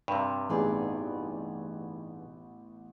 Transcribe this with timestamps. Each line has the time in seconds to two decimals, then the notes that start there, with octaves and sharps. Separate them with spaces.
0.08 G2 C3
0.49 A1 B3 D#4 G#4 D5